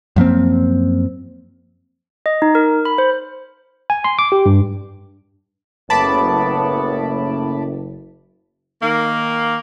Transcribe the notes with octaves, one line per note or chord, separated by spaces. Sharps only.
F#2 F3 A#3 C4
D#5
D#4
A#4
B5
C5
G#5
C6
D6
G4
G2
F#1 A2 B3 A5 B5 D6
D#3 A#3